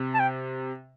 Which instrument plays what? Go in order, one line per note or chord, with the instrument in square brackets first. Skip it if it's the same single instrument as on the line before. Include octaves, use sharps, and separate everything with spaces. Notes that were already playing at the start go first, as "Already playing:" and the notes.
Already playing: [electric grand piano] C3
[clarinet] A5
G5